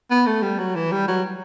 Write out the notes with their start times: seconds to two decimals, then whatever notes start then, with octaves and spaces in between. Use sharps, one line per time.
0.11 B3
0.26 A3
0.42 G3
0.59 F#3
0.75 E3
0.92 G3
1.08 F#3